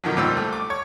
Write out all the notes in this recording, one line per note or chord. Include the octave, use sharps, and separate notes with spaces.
B2 D3 D#3 F3 F#3
C#2 A#2 G3 C5 E6
A3
D6
C#5